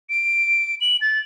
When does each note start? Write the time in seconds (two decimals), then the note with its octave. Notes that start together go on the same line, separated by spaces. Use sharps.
0.10 D7
0.81 F#7
1.01 A6